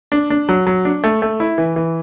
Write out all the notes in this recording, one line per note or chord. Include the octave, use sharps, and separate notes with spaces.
D4
D4
F#3
F#3
D4
A3
A3
E4
E3
E3